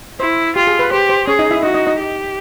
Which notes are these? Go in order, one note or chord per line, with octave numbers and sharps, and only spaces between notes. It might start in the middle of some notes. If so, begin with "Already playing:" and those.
E4 C5
F4 G4
G#4
B4
G4 C5
C5
C#4 G#4 C#5
D#4 D#5
E4 E5
D#4 F#4 D#5
D#4 D#5
D#4 D#5
G4